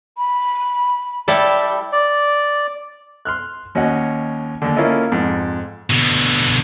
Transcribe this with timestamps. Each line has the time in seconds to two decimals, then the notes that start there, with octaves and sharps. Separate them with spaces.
0.17 B5
1.28 G3 E4 A4 D5
1.92 D5
3.25 C6 F6 F#6
3.75 D#2 C#4 F#4 D#5 F#5
4.62 D#2 D3
4.76 A#3 C#4 E4 F4 A4 D#5
5.12 F2 G#2 F#5
5.90 B2 D3